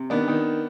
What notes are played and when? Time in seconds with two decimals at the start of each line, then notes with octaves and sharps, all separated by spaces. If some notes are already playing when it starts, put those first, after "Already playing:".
Already playing: C3
0.10 D#3 B3 D4
0.28 D#3